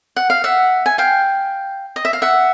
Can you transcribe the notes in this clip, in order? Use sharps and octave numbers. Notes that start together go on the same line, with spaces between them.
F#5
F5
E5 F#5
G#5
F5 G5
D#5
E5
F5
E5 F#5